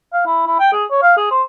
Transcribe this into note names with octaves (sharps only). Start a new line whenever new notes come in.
F5
E4
E4
G5
G#4
C#5
F5
G#4
C5